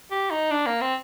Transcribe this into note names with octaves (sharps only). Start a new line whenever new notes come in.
G4
D#4
D4
A#3
C4